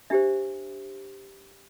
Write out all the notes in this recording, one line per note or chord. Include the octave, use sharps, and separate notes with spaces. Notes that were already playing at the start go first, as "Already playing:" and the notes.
D4 G4 C5 E5